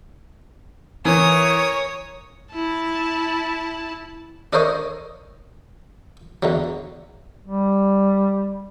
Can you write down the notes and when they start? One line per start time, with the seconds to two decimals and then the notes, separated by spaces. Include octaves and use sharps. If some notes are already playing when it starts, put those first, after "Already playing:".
1.05 E3 A#4 C#5 D#6
2.53 E4 A5
4.53 D4 A4 A#4 C5 C#5 D#5
6.43 E2 D3 F#3
7.45 G3